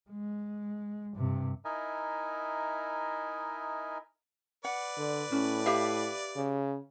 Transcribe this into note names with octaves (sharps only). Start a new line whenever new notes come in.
G#3
G2 C3
D#4 E4 A#4 D#5 E5 G#5
B4 D5 F#5
D3
A2 C#4
G4 E5 F5
C#3